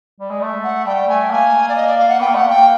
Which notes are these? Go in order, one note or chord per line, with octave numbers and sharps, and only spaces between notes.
G3
G#3
A3
F#5
G3 G5
A3 G#5
A#3 G#5
D5
D#5
D5
F5
F#5
B3 G5
A#3
A3 F#5
A#3
G5